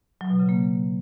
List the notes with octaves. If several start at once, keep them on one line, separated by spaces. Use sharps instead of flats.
F#3
B2
C#3
A#3